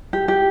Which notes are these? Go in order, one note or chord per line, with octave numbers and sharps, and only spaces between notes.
G4
G4